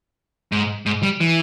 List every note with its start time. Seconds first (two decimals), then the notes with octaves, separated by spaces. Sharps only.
0.52 G#2
0.86 G#2
1.03 G3
1.21 E3